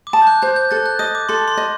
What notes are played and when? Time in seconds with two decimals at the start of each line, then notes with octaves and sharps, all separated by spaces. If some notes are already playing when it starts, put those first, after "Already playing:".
0.07 D6
0.13 A5 D#6
0.22 G6
0.27 F#6
0.42 C5 G6
0.56 G6
0.71 A4 F#6 A6
0.86 F#6
0.99 D#5 D#6
1.15 D6
1.29 A4 C6
1.48 C6
1.57 D#5